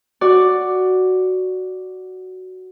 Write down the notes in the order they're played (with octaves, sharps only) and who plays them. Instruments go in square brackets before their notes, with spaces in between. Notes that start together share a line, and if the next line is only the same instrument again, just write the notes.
[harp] F#4 D5